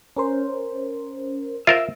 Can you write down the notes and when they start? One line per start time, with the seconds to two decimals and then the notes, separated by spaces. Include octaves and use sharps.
0.17 C#4 A#4 C5
1.67 F4 A#4 C5 E5